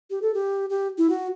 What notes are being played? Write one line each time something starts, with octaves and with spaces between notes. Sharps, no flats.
G4
A4
G4
G4
E4
F#4